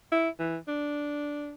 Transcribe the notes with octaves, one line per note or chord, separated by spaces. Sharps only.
E4
E3
D4